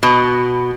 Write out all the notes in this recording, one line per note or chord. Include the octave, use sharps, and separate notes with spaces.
B2